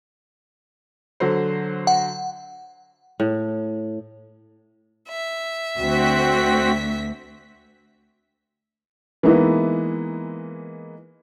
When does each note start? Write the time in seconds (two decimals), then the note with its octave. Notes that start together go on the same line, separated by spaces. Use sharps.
1.20 D3 F#3 C5
1.87 F#5
3.20 A2
5.09 E5
5.77 D2 C4 F#4 B6
9.23 E3 G#3 A#3 B3 D#4 E4